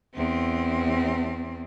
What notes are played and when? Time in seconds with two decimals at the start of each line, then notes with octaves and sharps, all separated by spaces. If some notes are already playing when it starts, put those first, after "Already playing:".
0.15 E2 C4